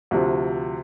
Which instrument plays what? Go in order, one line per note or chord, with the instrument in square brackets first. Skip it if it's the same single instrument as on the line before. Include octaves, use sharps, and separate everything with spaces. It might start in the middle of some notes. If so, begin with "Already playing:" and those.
[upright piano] D2 C3 F3